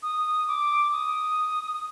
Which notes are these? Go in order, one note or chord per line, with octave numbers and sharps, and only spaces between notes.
D#6
D6
D#6